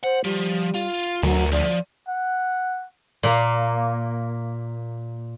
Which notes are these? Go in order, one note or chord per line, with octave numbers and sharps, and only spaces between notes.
C5 F#5
F3 G3
F4
D2 F#3 F#4 A#4
F3 D5
F#5
A#2 A#3